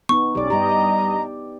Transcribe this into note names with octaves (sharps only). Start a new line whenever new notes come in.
B3 D#4 C#6
B1 C#4 G4 D5 D6
G2 G3 G4 D#5 A#5